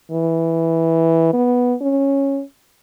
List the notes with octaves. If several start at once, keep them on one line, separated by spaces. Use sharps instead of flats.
E3
B3
C#4